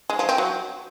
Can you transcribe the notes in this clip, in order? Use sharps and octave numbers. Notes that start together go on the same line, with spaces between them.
G#3
F3
C4
F#3